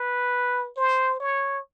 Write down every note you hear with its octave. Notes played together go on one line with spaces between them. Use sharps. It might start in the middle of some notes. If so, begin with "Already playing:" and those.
Already playing: B4
C5
C#5